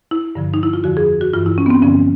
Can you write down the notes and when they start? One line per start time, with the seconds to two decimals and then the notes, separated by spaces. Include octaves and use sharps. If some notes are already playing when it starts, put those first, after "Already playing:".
0.11 E4
0.35 G2 D3 F3
0.54 D#4
0.63 E4
0.73 F4
0.84 F2 D3 F3 F#4
0.97 G#4
1.21 F#4
1.33 G2 E3 F4
1.46 E4
1.58 C#4
1.66 B3
1.70 C4
1.82 G2 D3 F3 C#4